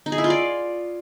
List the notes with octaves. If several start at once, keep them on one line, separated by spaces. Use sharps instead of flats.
D#4
G#4
E4
F4
D5